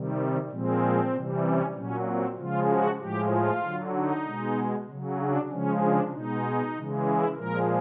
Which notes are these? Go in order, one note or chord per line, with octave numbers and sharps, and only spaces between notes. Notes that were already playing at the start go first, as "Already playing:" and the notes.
Already playing: C3 D#3 G3
A#2 F3 G#3 C4
C3 E3 G3
C#4
A#2 F#3 C#4
C4
C#3 F3 G#3 F4
F#4
A2 F3 G#3 G4
F4
D3 F#3
D#4
B2 G#3
C#3 F#3
D4
C#3 F3 G#3 C#4
D4
B2 G#3 D#4
C#3 E3 G#3
E4
A#2 F3 G#3 A#4